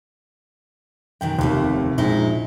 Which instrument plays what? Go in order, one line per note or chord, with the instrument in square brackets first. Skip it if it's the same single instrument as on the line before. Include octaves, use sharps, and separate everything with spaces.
[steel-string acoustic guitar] F#2 B2 D#3 [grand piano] G5
[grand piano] F1 D#2 [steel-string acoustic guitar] A2 C3 A3
[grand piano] A#1 [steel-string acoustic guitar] G#3 D#4 E4